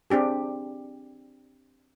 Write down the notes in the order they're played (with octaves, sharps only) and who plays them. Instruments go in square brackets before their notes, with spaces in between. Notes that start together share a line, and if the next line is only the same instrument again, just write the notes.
[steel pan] C4 D4 G4 G#4